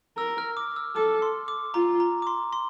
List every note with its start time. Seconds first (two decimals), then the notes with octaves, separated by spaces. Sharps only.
0.17 A#4 E6
0.38 F6
0.57 D6
0.76 E6
0.95 A4 D6
1.22 C6
1.48 D6
1.74 F4 A#5
2.00 A#5
2.22 D6
2.27 C6
2.53 C6